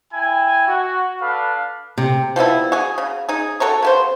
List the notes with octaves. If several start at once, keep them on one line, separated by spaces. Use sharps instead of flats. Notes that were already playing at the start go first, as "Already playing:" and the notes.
E4 G5 G#5
F#4
D4 A4 B4 F5
C3
F3 G3 B3 E4
F#4 G#4
C#3
D#4 G#4
F#4 A4 A#4 C#5
C#3 B3 C5